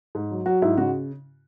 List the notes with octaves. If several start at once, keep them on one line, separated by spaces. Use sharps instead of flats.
G#2
F#3
F#3 F#4
G#2 E4
C#3 F#4